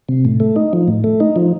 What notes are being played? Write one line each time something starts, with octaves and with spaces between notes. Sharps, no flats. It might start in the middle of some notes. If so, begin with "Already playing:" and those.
C3
A2
A3
D#4
F3
A2
A3
D#4
F3